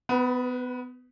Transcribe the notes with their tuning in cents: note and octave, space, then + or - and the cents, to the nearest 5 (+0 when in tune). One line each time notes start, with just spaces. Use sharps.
B3 +25 B4 -20